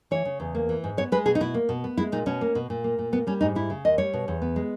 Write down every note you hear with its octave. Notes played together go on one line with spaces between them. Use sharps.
E3 C#5
C#3
E2
A#3
E3
G#2
B3 C#5
G#3 B4
B2 G#4
D#4
B2 E4
A#3
B2
B3
G#3 E4
A#2 D#4
B2 C#4
A#3
B2
A#2
A#3
A#2
A#3 B3
G3 C#4
G#2 D#4
G3 E4
C#3
D#2 D#5
G3 C#5
B2
E2
B3
G#3